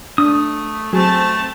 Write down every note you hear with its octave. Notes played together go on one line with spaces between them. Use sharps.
A3 D4 D#6
F#3 A3 C4 G#4 A5